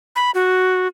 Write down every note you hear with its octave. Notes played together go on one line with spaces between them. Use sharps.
B5
F#4